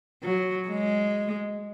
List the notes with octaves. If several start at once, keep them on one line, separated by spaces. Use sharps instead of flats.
F#3
G#3